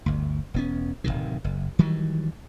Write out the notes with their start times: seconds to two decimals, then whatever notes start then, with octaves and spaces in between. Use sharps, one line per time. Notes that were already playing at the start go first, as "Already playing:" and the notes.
0.06 G1 D2
0.54 E1 B3 C#4
1.04 D1 B1 C3 D#3
1.44 F#1
1.79 D#3 E3 F#3 G3